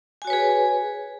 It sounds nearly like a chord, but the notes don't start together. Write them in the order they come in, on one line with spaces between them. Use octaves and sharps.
G#5 F#4 C#5 B4 G#4